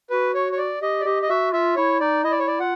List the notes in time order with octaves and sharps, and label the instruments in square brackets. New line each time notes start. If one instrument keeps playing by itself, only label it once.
[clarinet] F#4 [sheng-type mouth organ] B4
[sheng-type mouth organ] C#5
C#5
D5
[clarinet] G4 [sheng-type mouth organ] D#5
[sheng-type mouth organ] D5
[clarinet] G4 [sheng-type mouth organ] D#5
[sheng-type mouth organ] D#5
[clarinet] F#4 [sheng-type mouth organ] E5
[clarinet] F4 [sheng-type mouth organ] E5
[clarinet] E4 [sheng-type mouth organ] C#5
[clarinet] D#4 [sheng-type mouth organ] D5
[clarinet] E4 [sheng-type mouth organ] D#5
[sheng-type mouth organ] D5
C#5
D5
[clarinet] F4 [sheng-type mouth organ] F#5